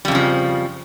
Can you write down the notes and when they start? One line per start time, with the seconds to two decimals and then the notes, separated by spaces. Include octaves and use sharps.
0.05 G3
0.08 F2
0.11 C#3
0.15 F3